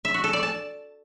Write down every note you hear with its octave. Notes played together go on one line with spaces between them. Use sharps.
E5
F#4
A4
D5
A5